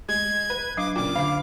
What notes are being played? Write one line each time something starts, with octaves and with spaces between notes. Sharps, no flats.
G#3 G#6
B4
F#3 D4 F5 D6
A#2 C#3 G5 D6
D3 D4 F5